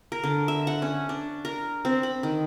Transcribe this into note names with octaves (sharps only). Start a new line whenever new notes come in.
A#4
D3
E5
F#5
C#4
D4
A#4
C4
B5
D#3